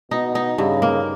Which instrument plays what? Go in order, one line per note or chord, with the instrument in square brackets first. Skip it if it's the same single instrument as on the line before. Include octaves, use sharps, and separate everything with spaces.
[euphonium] B2 [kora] D#4
[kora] D#4
[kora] G2 [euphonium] C#3
[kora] A#3